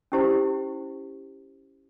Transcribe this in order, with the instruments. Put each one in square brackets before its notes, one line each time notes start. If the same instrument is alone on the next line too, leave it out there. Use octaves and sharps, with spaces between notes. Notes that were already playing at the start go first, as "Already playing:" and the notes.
[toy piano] C#4 E4 G4 C5